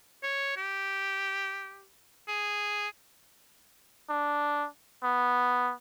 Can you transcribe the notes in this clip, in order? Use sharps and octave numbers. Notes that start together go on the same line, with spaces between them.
C#5
G4
G#4
D4
B3